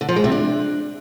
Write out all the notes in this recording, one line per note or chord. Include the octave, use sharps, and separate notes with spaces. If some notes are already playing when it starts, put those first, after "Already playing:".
D3
F3
G#3
C3
D4